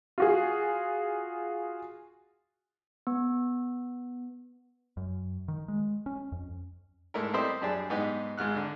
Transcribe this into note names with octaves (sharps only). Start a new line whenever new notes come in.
F4 F#4 G#4
B3
F#2
D#3
G#3
C#4
F2
G#2 A3 E4 A#4
G3 C4 E4 G4 C5 D#5
F#2 G3 D4 G#4 A5
G#2 B3 D#4 G4
G#1 G#2 F6 F#6
D3